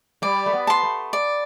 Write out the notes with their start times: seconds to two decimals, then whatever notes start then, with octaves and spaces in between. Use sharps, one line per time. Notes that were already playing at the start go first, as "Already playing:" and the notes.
0.22 G3 D5
0.46 A3
0.53 B3
0.67 A5 C6
0.83 A3
1.13 D5